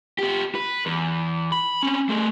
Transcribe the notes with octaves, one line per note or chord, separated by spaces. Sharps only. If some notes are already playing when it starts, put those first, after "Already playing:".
B3 G4
B4
E2
B5
C4 C#4
A3 G#4